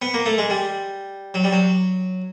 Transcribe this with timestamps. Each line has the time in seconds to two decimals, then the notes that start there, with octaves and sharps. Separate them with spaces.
0.02 B3
0.14 A#3
0.26 A3
0.38 G#3
0.50 G3
1.34 F#3
1.44 G3
1.52 F#3